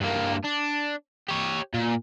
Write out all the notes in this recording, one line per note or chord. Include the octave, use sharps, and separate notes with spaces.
G2 A#3
D4
G4 C#5
A#2